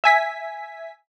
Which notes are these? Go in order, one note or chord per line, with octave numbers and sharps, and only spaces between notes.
E5 G#5 B6